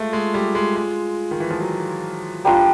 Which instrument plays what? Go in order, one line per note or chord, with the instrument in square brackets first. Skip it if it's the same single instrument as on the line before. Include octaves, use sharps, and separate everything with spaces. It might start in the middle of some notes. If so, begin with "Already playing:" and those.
Already playing: [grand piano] G#3 A3 [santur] F4
[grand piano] G#3
G3
G#3
G#3
D#3
E3
F3
F#3
[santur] G3 A#3 D4 F4